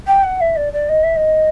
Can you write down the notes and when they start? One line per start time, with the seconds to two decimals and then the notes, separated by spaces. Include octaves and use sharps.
0.07 G5
0.23 F#5
0.40 E5
0.56 D5
0.72 D5
0.88 D#5
1.03 E5
1.16 D#5